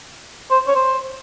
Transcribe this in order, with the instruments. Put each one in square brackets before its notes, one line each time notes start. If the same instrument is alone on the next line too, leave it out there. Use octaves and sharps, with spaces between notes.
[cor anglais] C5
C#5
C5